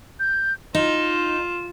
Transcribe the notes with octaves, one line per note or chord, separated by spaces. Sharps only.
G6
D#4 F4 E7